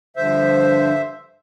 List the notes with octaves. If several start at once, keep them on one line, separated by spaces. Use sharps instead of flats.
G2 D3 F3 C5 E5